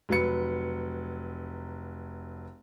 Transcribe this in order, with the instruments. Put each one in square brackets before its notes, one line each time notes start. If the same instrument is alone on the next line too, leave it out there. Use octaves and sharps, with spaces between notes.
[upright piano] F1 F#3 B4 C#7